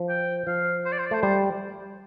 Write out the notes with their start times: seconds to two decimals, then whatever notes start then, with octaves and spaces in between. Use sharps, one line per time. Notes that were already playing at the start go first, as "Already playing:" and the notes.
Already playing: F3
0.09 G5
0.47 F3 F5
0.85 C5
0.92 D5
0.98 C5
1.06 D5
1.11 A3 C5
1.22 G3 C5